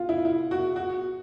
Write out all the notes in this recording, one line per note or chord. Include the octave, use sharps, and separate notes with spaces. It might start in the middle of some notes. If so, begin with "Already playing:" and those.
Already playing: F4
E4
E4
F#4
F#4